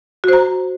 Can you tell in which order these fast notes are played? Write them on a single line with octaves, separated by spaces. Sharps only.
F#4 C5 A#5